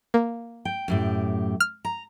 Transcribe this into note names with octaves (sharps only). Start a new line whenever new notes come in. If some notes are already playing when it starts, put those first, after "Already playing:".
A#3
G5
F#2 A2 G4
F6
A#5